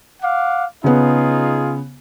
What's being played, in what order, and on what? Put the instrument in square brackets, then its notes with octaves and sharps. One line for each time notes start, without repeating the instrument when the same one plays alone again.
[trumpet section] F5 F#5 D6
[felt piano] C#3 B3 [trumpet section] D#4 F4 G#4